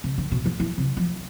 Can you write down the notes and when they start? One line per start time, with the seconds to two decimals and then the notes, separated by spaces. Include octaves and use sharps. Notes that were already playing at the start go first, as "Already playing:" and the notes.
0.04 C3
0.18 D3
0.32 B2
0.46 F3
0.60 E3
0.78 C3
0.97 F3